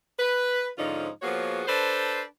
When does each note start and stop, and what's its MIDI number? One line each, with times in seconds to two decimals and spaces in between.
0.19 0.68 71
0.78 1.09 44
0.78 1.09 50
0.78 1.09 53
0.78 1.09 61
0.78 1.09 63
0.78 1.09 65
1.22 1.62 53
1.22 1.62 58
1.22 1.62 59
1.22 1.62 66
1.22 1.62 68
1.22 1.62 73
1.68 2.23 62
1.68 2.23 69
1.68 2.23 71
1.68 2.23 72